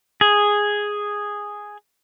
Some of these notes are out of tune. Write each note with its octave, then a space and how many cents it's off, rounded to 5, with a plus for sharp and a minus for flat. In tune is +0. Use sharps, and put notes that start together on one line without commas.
G#4 -5